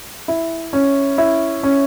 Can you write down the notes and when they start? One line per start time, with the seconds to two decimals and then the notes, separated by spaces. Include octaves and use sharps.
0.28 E4
0.73 C#4
1.18 E4
1.63 C#4